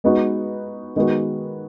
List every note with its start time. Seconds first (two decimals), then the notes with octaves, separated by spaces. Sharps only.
0.04 G#3 B3 D#4 F#4
0.96 D#3 G#3 B3 F#4